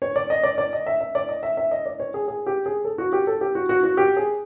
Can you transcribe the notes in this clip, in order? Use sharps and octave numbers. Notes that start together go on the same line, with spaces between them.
C#5
D5
D#5
D5
D5
D#5
E5
E5
D5
D#5
E5
E5
D#5
D5
C#5
G#4
G#4
G4
G#4
A4
F#4
G4
A4
G4
F#4
F#4
F#4
G4
G#4